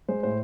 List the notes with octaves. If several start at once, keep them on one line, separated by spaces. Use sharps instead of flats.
G#3 C5
A2 C5